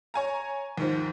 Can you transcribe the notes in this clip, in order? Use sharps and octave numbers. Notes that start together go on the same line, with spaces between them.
C#5 G#5 A#5
D#2 G#2 F3